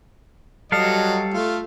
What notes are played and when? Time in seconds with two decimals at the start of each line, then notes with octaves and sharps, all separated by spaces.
0.72 F#3 G3 A4 D#5 F5
1.34 A3 F4